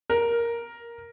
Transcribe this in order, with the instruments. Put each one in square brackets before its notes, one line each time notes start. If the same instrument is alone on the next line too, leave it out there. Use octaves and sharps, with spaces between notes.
[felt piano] A#4